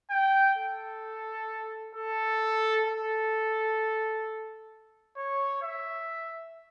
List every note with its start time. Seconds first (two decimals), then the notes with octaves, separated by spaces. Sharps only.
0.10 G5
0.57 A4
1.96 A4
2.87 A4
5.17 C#5
5.63 E5